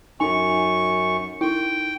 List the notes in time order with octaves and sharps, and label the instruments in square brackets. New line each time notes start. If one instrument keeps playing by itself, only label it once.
[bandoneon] F#2 C#6 [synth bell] D#4 G#5
[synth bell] D#4 E4 [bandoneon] G5